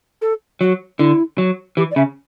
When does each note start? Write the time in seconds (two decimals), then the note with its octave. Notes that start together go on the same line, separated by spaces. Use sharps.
0.22 A4
0.61 F#3 F#4
0.99 D3 E4
1.38 F#3
1.77 E3 G4
1.91 D5
1.96 C#3 E5